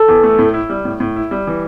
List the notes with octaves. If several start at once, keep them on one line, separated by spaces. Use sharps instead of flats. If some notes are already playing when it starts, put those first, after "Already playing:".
Already playing: A4
E2
A3
A2
E4
G3
A2
A2
E4
G3
E3